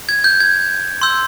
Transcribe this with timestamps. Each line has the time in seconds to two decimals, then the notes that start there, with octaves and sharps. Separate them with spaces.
0.09 G#6
0.24 G6
0.40 G#6
1.01 C6 E6 G6